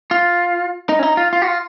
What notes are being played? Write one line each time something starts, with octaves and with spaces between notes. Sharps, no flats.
F4
D#4
C#4
D#4
F4
F4
F#4
F4